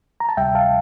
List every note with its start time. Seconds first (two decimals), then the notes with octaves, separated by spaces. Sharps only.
0.20 A#5
0.29 A5
0.37 D2 C3 G3 E5 G5
0.55 F5 A5